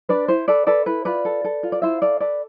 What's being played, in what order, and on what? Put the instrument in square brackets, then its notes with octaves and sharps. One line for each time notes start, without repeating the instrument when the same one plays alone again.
[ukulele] D4 B4 D5
E4 C5
A4 B4 D5
A4 B4 D5
E4 B4
F4 B4 D5
A4
A4
F4
D5
E4 C5 E5
A4 D5 F5
A4 B4 D5